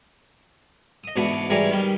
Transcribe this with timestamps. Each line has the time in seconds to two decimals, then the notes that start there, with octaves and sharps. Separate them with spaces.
1.04 D#5 D#6
1.16 G#2 B2 E3 D4 F#4
1.50 G#2 E3 G3 G#4 C#5 A#5
1.70 D#3 G3